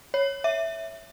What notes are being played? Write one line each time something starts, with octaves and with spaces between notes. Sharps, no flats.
C#5
E5